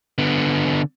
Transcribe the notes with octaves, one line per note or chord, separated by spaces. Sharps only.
D3 B3